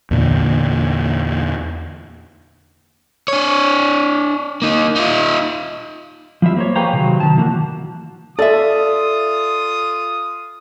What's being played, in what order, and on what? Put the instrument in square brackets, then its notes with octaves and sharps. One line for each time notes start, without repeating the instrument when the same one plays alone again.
[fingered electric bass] E2 A#2 D3
[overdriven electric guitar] D4 C#5
A#3 D#4
D#4 F4
[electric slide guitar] F3 G3 F4 E5
A#3 C5 C#5
G#4 B4 C#5 F5 G5 A#5
C3 D#3 F#3
D#3 A5
D#3 E3 A#3 E4 F#4
[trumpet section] F4 D#6 [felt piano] A4 [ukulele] D5 E5